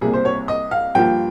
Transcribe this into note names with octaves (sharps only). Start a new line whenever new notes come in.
C2 C3 G3 A#3 G#4
C5
C#5
D#5
F5
G2 F3 A#3 F4 G5